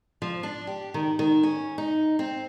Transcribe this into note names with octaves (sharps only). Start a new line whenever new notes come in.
F3
D4
G4
D#3
D#3
C#4
D#4
C4